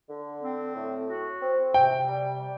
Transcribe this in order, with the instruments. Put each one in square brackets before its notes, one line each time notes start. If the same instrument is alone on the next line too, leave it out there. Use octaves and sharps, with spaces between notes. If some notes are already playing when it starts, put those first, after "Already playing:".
[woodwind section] D3
C4
A2
F#4
C4
[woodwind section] C3 [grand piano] G5
[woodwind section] G3
G3